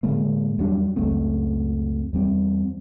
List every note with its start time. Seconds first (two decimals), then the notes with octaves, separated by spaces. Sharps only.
0.03 A2 D3 G#3 A#3
0.58 E2 F#3 G3 D4
0.96 C#2 F#2 A3 C4
2.13 E2 G3 C4